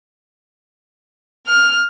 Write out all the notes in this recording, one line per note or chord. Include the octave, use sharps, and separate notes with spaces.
F6